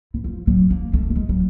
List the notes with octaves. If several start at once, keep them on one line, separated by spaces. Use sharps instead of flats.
E3
F3
F#3
A#3
A3
G3
G#3
F#3